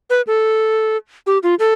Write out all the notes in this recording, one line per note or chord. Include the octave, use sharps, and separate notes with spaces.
B4
A4
G4
F4
A4